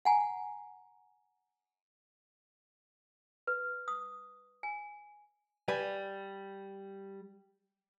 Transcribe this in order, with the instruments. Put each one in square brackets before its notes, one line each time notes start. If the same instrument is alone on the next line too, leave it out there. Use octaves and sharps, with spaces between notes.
[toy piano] F#5 G#5 A#5
B4
D#6
G#5
[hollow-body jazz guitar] G3 B4 G#5